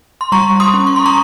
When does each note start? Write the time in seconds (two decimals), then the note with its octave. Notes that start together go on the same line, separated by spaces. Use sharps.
0.21 C6
0.32 G3 A#5 C#6
0.60 C6 D#6
0.74 C#4
0.87 C#6
0.96 C6
1.06 A#5 C#6